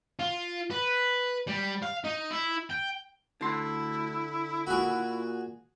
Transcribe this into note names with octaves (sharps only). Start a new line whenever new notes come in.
F4
B4
G3
F5
D#4
E4
G5
D2 D3 E4 C6
A#2 F#4 G#4